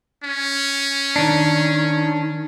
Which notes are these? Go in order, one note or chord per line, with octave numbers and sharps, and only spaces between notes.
C#4
D#3 D4